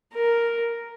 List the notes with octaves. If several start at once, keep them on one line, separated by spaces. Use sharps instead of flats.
A#4